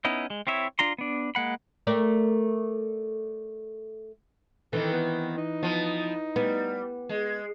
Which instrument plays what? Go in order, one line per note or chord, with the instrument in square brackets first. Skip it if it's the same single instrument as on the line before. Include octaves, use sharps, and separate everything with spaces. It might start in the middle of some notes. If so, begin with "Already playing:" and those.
[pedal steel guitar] B3 C#4 D#4 E4
G#3
C4 E4 C#5 E5
D4 F4 A#5 C6
B3 D4
G#3 A#3 F#5 B5
[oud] A3 A#4 D5
[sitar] D#3 C4 [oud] E3 [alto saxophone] A4
[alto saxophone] B3
D#4
[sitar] F3 B3
[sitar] G3 [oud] B3
[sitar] G#3